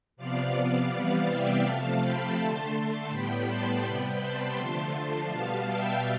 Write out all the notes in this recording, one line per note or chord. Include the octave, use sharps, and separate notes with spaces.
C3 F3 B3 D5 F5
D5 F5
C3 E3 G3 B3 D5 F5
E5 G5
C3 F3 A3 F5 A5
G5 B5
D3 A3 A5 C6
A5 C6
A2 G3 B3 G5 B5
A5 C6
C3 G3 B3 G5 B5
A5 C6
D3 F3 A3
A5 C6
B2 G3 B3 F5 A5
E5 G5